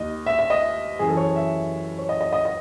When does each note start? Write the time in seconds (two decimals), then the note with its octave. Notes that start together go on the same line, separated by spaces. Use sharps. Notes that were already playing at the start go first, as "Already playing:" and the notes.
Already playing: D#2 D#3 D#5
0.26 E5
0.39 E5
0.50 D#5
0.99 F#2 E3 G#4
1.09 A4
1.17 C#5
1.36 E5
1.98 C#5
2.09 D#5
2.21 D#5
2.32 D#5
2.45 D#5